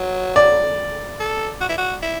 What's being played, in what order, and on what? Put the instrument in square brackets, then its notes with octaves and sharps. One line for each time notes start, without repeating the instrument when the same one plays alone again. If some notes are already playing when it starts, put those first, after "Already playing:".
Already playing: [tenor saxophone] F#3
[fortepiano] D5
[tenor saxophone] A4
F#4
E4
F#4
E4